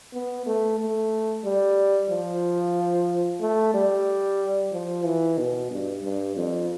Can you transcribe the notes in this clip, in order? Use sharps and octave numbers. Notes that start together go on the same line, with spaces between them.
B3
A3
A3
G3
F3
A3
G3
F3
E3
B2
G2
G2
F2